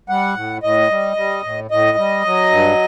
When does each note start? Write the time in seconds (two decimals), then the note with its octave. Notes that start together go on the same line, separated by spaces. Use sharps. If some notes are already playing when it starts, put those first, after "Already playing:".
0.09 G3 F#5
0.36 A2
0.63 A2 D#5
0.90 G3
1.17 G3
1.44 A2
1.71 A2 D#5
1.98 G3
2.25 F#3
2.51 G2